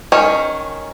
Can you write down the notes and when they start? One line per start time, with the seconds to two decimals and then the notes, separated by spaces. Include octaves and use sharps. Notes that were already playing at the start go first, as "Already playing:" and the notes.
0.12 D#3 C#4